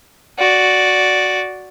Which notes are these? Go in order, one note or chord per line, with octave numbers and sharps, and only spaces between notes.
F#4 D5